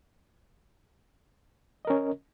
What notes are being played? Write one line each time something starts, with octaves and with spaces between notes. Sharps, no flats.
C#4 A#4 D#5